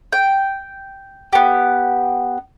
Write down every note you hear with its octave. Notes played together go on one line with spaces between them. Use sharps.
G5
B3 G4